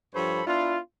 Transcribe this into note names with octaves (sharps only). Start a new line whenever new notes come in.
G2 F3 A4 C5 C#5 B5
B3 D4 E4 F4